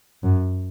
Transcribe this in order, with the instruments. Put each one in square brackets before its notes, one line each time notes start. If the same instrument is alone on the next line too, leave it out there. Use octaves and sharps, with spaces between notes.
[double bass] F#2